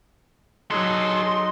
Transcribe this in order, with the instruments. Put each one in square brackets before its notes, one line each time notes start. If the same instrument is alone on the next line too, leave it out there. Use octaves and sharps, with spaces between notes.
[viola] F#3 [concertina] D#4 [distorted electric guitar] G#4 A4 [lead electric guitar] C6